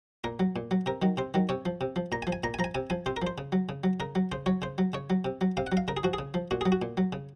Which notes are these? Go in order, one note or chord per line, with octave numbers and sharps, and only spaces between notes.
A#2 A#4
F#3
A#2
F#3
C3 A#4
D#3 F#3
C3 C5
D#3 F#3
C3 C#5
F3
C3
F3
A#2 A#5
G#5
F3
G#5
A#2 A#5
G#5
F3 A#5
G#5
C3 G#5
F3 G#5
C3 C5
A#4
F3 C5
C#3
F#3
C#3
F#3
C#3 A#4
F#3
C#3 C5
F#3 C#5
C#3 C5
F#3
C#3 C#5
F#3
C3
F#3
C3 F5
F#5
F#3
F5
C#3 A#4
G#4
F3 F#4
G#4
C#3
F3
A#2 F#4
F#3 G#4
F#4
A#2
F#3
C#3